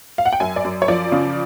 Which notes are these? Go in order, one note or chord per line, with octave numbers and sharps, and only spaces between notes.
F5
F#5
G5
F#2 G#5
D5
F#2
C#5
F3 D5
C#3